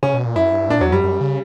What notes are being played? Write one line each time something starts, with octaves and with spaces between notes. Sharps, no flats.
C#3 C#4
B2
A#2
F#2 E4
G2
A#2 D4
E2 F#3
F#2 G3
F#2
C#3